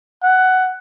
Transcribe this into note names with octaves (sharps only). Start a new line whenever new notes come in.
F#5